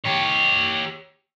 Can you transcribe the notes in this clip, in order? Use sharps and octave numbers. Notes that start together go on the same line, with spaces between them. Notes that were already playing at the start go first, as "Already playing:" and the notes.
G4 C#5